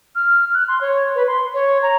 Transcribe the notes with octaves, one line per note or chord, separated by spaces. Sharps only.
F6
F#6
C6
C#5
B4
C6
C#5
A#5